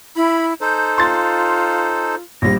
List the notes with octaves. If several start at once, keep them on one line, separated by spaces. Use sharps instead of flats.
E4 B5
D#4 A4 C5 G6
F4 C6 A6
A#1 G3 A#6